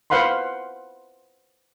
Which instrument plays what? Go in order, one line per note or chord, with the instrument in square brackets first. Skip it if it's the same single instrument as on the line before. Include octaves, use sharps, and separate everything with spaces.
[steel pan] B4 C5 F5 F#5 B5 C6